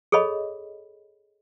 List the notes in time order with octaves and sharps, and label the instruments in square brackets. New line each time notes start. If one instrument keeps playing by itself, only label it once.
[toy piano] G#4 A4 C#5 D#5 B5